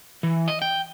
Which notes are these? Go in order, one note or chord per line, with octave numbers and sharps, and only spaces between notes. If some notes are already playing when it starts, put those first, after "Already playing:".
E3
D#5
G5